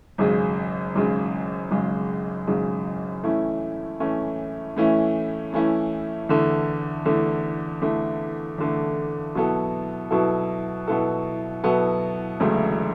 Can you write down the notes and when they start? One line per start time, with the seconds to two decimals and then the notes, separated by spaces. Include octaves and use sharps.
0.18 G#1 F#2 C#3 G#3
0.95 G#1 F#2 C#3 G#3
1.71 G#1 F#2 C#3 G#3
2.47 G#1 F#2 C#3 G#3
3.24 A2 E3 A3 C#4 E4
4.00 A2 E3 A3 C#4 E4
4.77 A2 E3 A3 C#4 E4
5.53 A2 E3 A3 C#4 E4
6.29 E2 D3 A3
7.06 E2 D3 A3
7.82 E2 D3 A3
8.58 E2 D3 A3
9.35 B2 F#3 B3 E4 A4
10.11 B2 F#3 B3 E4 A4
10.88 B2 F#3 B3 E4 A4
11.64 B2 F#3 B3 E4 A4
12.40 E1 D2 C#3 F#3 A3